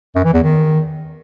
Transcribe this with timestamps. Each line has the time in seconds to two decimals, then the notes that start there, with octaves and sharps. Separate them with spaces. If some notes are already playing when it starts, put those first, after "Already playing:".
0.15 F#2
0.25 E3
0.34 E2
0.43 D#3